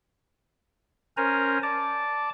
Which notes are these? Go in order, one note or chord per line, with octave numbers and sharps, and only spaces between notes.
C#4 A#4 C5 G#5 A#5
D5 A5 D6